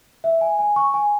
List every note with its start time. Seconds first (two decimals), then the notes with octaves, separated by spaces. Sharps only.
0.24 E5
0.41 G#5
0.59 G#5
0.76 C#6
0.94 G#5